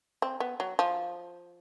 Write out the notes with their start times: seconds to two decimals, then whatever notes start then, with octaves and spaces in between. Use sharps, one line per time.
0.22 C4
0.40 B3
0.60 F#3
0.79 F3